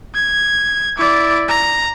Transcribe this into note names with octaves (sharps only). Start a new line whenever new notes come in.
G#6
E4 D5
A#5